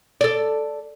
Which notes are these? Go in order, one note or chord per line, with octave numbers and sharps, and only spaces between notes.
A4 D5